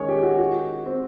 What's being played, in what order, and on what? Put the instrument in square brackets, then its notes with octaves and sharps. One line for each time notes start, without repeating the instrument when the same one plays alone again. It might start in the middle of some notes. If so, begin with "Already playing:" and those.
Already playing: [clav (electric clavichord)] D#3 G#3 C#4 [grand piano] C#5
[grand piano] G4
F#4
F#4
C4